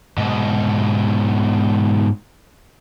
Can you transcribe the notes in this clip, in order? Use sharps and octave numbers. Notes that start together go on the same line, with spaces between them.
G#2 B2